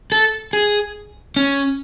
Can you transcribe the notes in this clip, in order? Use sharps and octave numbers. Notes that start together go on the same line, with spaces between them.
A4
G#4
C#4